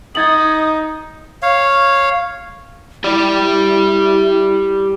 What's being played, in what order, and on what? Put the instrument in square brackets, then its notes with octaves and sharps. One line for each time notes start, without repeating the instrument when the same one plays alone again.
[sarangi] D#4 [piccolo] D#6 [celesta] G#6 A6 F#7
[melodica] C#5 F5
[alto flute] E4 [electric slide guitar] G4 D5